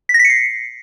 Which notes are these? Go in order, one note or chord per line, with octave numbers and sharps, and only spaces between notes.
B6
A#6
B6
C#7
C7